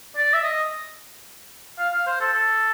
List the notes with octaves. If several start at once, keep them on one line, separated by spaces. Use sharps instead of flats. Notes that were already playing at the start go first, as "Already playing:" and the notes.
D5
E5
D#5
F5
F5
C5
A4
A4